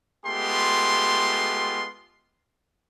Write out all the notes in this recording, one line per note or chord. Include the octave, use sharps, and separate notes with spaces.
G#3 A3 B3 F4 G4 C6